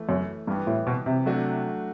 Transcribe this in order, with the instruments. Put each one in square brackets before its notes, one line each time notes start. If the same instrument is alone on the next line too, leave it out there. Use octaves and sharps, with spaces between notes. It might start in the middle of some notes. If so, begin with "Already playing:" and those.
Already playing: [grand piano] E3 A3 E4
[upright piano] F#2
[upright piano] G2 [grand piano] E3 G3 B3
[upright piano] A2
B2
C3
[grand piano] F#3 A3 D4 F#4